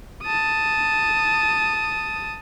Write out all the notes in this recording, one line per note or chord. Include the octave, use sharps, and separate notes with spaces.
A5 D#6